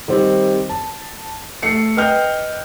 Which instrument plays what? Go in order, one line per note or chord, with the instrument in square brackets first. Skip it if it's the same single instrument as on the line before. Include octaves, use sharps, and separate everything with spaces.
[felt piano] D#3 G3 C4
A5
A3 C7 C#7
B4 D#5 G5 F6 G6